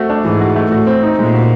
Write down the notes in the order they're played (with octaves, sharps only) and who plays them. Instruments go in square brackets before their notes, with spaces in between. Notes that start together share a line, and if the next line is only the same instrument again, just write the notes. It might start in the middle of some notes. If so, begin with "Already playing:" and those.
Already playing: [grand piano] A3 C4 F#4
D4
[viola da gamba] G#2 [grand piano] E3
[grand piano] F#4
A3
[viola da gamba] A2 [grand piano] F#4
[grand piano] C4
D#4
[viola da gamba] A#2 [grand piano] G#3
[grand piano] F#4